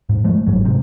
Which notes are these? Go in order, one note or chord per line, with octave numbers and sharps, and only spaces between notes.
G#2
F3 G#3 A3
G1 G#2 F#3
G#2 C3